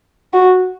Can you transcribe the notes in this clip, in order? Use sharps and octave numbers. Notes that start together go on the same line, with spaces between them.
F#4